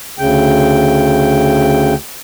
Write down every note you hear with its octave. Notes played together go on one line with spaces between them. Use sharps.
D2 C#3 G5